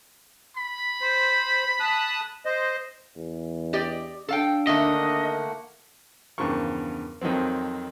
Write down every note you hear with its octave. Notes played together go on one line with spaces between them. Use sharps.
B5
C5
A5 D#6 F#6
C5 D#5
E2
G4 D5 D#5
D4 A4 F5 G5
D3 D#3 A3 A#3 D#5 E5 F#5
E2 G2 C#3 F3 A#4 C#6
F2 D#3 F3 F#3 C4